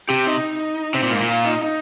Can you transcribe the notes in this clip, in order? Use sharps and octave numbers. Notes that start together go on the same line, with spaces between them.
C3 G4
D#4
C3 C4
A#2
G#2 A#3
A#2
F4
D#4
D#4